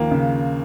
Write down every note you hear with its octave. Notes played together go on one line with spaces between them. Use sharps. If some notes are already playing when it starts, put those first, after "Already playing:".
Already playing: D#2 F3 A#3
C#3